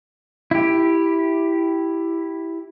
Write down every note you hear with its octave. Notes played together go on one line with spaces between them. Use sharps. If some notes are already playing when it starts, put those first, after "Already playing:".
E4 G4